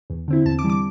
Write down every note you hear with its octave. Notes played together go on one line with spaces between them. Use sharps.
E2
D3 C4 E4
E2 A5
D6
E3 G3
D6